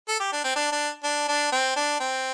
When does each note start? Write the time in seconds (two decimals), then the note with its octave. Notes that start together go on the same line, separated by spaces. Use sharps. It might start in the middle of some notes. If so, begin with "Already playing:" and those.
0.08 A4
0.20 G4
0.33 D4
0.44 C4
0.56 D4
0.72 D4
1.03 D4
1.28 D4
1.52 C4
1.76 D4
2.00 C4